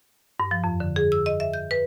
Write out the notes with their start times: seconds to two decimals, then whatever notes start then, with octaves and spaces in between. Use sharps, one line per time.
0.40 G2
0.51 F3
0.64 F2
0.80 D3
0.96 G#4
1.12 E6
1.26 D#5
1.40 E5
1.54 G6
1.71 B4